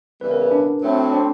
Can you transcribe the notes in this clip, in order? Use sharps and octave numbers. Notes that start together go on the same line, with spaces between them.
C#3 E3 G3 B3 B4
A#4
G#4
D4
A2 F#3 A3 C4
D4